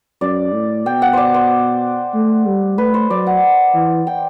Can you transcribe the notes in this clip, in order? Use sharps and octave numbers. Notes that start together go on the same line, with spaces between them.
F#2 D5
A2
B2 G5
F#5
C5 D5
C5
A3
G3
A3 B4
C5
F#3 D5
F#5
E3
G5